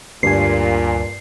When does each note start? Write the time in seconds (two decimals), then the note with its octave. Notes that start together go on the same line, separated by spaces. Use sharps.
0.23 D2 G2 A#2 G#5 C7